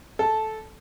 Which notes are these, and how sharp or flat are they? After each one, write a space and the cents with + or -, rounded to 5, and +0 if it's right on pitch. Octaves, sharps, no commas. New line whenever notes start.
A4 -10